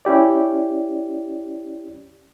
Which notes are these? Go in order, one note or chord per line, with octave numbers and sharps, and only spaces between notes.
C#4 E4 G4 D5